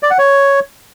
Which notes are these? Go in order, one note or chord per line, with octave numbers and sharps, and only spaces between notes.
D5
F#5
C#5